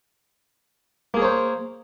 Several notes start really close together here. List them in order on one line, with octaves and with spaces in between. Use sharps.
A#3 G#4 A#4 C#5 C5